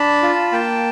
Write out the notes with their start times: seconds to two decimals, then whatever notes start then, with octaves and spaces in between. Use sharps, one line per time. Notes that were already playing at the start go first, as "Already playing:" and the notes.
Already playing: D4 A5 B5
0.23 F4
0.52 A#3 G5 A5